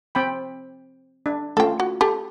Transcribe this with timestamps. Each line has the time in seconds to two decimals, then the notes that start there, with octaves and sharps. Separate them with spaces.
0.15 C4 G5 B5
1.26 D4
1.57 A3 C#4 F4 A4 G5
1.80 F#4
2.01 G4 A4